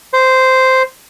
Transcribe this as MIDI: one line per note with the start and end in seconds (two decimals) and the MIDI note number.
0.13 0.82 72